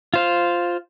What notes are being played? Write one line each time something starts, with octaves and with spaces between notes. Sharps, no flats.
F4 C5 F5